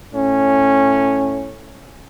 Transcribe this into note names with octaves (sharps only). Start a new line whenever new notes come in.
A2 C#4